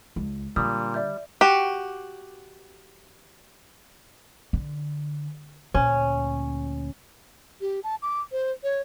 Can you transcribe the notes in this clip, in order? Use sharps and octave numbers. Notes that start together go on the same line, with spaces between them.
C#2
A#2 D3 G3 D#6
D5 E5 G6
F#4 G4
D3
D2 A#2 C#4
G4
A5
D6
C5
C#5